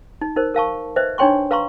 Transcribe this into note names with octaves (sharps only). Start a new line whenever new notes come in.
D#4
D#4 A#4 C5
A#4 F5 A5 C#6
B4 C5 D#5 E5
D4 D#4 C#5 G5 C6 C#6
B4 F5 A#5 C6 C#6